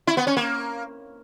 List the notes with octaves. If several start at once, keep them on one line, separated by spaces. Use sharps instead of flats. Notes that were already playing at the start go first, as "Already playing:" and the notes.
E4
B3
C#4
A#3